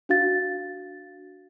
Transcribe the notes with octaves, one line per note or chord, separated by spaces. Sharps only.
D4 F#4 F5 A6